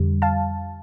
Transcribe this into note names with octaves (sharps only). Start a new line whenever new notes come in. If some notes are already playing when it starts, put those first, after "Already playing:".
Already playing: F2 D3 G3
F5 A5